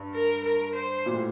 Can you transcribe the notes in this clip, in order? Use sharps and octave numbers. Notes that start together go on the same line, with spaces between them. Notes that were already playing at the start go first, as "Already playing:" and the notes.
Already playing: G2
A#4
A#4
C5
A#2
A2